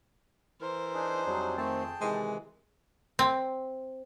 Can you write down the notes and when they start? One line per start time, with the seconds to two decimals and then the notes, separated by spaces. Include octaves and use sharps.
0.61 E3 A#4 C5
0.94 D4 D#4 G#4
1.26 F2 F#3 G3
1.57 D#3 A3 C4 G#4 G5 A5
2.01 C3 D#3 E3 G#3
3.19 C4